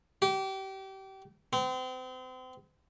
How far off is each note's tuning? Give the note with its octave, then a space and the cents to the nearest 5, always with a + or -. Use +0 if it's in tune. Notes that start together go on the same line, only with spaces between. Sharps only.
G4 -30
C4 -35